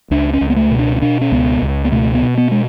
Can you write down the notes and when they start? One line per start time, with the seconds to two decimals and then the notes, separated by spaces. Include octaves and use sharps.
0.11 C#2 D4
0.33 C#4
0.41 C#2
0.50 B3
0.56 A3
0.71 B2
0.79 D4
0.96 C#4
1.01 B2 D4
1.21 C#4
1.32 C#2 B3
1.62 C#2
1.85 B3
1.92 B2 A3
2.15 B3
2.22 B2
2.37 B3
2.51 G#3